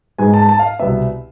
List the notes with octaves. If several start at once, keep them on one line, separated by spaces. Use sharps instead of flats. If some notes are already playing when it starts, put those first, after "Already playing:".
G#2 G#3 B3 G#5
A5
A5
F5
C2 B2 B3 E5